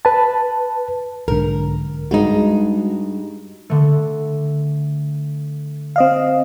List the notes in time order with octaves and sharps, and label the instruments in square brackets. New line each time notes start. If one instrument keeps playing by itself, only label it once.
[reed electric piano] B4 A5
[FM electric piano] B1 G#2 D3 [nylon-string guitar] A#4
[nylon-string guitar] G2 D#4 [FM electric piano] G#3 F#4
[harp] D3 A3
[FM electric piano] C4 D#5 F5